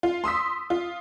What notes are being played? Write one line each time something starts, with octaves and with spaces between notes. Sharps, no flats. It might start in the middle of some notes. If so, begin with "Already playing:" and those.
F4
C6 D#6 E6 B6
F4